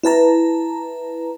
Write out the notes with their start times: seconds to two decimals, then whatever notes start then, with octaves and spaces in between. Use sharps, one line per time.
0.03 E4 B4 A5 A#5